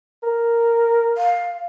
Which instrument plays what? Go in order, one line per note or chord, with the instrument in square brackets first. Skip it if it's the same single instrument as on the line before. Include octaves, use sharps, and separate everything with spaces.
[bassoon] A#4
[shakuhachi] F5